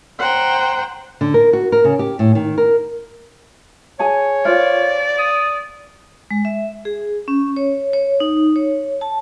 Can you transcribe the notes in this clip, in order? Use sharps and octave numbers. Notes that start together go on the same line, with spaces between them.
C5 F#5 G5 A#5
D3
A#4
F#4
A#4
C#3
G4
A2
D#3
A#4
G#4 C#5 G#5 A5
F4 C5 D5 F5
D#6
G#3
E5
G#4
C#4
C#5
C#5
D#4
C#5
A5